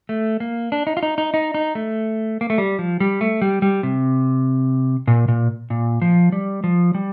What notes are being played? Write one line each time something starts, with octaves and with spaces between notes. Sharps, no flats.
A3
A#3
D4
D#4
F4
D#4
D#4
D#4
D#4
A3
A#3
A3
G3
F3
G3
A3
G3
G3
C3
A#2
A#2
A#2
F3
G3
F3
G3